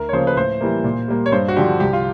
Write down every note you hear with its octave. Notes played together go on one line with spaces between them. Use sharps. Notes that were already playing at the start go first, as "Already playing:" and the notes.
Already playing: D2 A#4
C#5
C#3 F3 A#3 C5
B4
A2 C5
E3 G3 A#3
A#2
G3 A#3
C#5
G2 C5
F#4
D3 F3 G4
C2 G4
F4